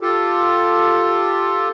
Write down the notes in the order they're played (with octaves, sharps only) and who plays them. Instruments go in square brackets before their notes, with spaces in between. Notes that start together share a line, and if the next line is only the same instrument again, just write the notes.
[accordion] F4 G4 A4